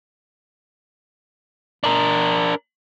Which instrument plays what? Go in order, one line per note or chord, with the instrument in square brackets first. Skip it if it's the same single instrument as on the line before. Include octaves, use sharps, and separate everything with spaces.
[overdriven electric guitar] D4 A#4